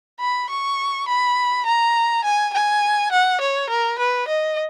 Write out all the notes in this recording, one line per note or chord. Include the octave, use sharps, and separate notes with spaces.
B5
C#6
B5
A#5
G#5
G#5
F#5
C#5
A#4
B4
D#5